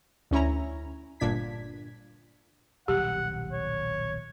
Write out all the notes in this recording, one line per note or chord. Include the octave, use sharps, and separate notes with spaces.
D2 C#4 E4 A#5
G1 A#2 D4 G#6 B6
D#1 B1 G3 G4 F#5
C#5